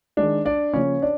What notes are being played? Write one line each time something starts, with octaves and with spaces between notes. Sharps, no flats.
D#3 G#3 D4 D5
D4 D5
C#3 F3 A#3 C#4 C#5
D4 D5